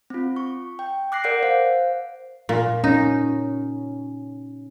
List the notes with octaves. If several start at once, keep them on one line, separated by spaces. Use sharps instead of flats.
C4 F4
C#6
G5
D6 F#6 A#6 C7
A#4 D5 F#5 G6 C7 D7
C5 F5
A#2
C#4 D#4